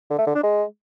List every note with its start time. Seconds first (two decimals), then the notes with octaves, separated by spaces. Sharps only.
0.10 D3
0.18 A3
0.27 D3
0.35 D4
0.43 G#3